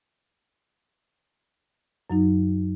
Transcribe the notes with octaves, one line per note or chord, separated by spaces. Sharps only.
F#2 F#3 D#4